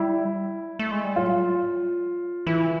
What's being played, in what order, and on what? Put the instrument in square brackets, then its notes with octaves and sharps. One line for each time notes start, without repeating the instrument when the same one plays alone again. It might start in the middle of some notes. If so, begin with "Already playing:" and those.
Already playing: [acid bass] G3 [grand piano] E4
[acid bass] A3
G#3
G3
[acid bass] F#3 [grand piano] F4
[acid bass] E3 [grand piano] E4